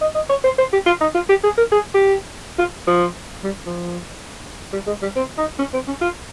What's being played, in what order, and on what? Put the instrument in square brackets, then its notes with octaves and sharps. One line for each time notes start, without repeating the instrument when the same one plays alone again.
[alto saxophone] D#5
D#5
C#5
C5
C5
G4
F4
D#4
F4
G4
G#4
A#4
G#4
G4
F4
F3
G3
F3
G3
G#3
G3
C4
D#4
C#4
C4
C#4
F4